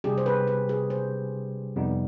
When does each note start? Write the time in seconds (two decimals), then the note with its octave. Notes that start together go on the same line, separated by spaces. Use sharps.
0.04 C3 G3 D4 G4 G#4
0.18 C5
0.26 B4
0.47 B4
0.69 G#4
0.90 C5
1.76 F2 C3 G3 B3 D#4